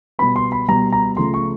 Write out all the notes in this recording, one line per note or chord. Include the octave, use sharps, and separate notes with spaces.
B2 G3 B3 B5
C6
B5
B2 G3 B3 A#5
A#5
C#3 F3 A3 C6
C#6